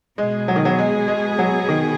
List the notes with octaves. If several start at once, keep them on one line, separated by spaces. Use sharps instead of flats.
B2 G#3 B3 G#4
F#3
D#3
F#3
G#3
G#3
F#3
D#3